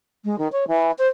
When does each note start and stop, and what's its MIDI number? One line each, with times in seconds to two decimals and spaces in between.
0.24 0.38 56
0.38 0.48 51
0.52 0.67 73
0.68 0.91 52
0.98 1.07 72